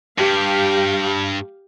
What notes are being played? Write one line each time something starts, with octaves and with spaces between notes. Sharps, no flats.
G2 G4 F5